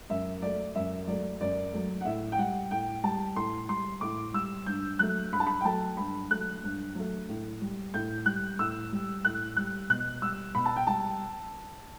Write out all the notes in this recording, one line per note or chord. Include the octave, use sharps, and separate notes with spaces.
F#2 E5
F#3 A3 D5
F#2 E5
F#3 A3 D5
F#2 D5
F#3 A3
F#5
A2 E5
G5
G3 F#5
A2 G5
G3 A5
A2 C6
G3 C6
A2 D6
G3 E6
G2 G6
F#3 A3 F#6
G2 B5
A5
B5
G5
F#3 A3 A5
G2 B5
F#3 A3 F#6
G2
F#3 A3
A2
G3
A2 G6
G3 F#6
A2 E6
G3
A2 F#6
G3 F#6
B2 F#6
G3 E6
B2 B5
A5
G5
G3 A5